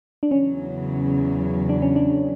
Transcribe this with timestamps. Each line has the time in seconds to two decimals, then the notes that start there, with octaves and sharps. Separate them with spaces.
0.23 D4
0.31 E2 C#3 F#3 C#4
1.69 D4
1.82 C#4
1.96 D4